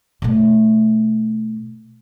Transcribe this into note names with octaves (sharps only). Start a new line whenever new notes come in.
B2 A3